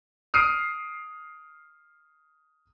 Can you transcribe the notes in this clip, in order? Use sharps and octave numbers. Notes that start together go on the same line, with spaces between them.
D#6 F6 C7 D7 D#7